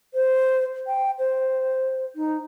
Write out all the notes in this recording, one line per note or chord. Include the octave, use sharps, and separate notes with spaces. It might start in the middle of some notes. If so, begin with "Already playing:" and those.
C5
G5
C5
D#4